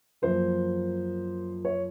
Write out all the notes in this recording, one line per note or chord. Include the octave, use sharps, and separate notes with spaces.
F#2 F3 A#3 C5
C#5